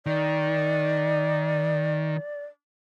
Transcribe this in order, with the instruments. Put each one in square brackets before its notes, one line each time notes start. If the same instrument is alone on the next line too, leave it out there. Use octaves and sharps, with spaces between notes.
[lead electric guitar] D#3 [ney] D5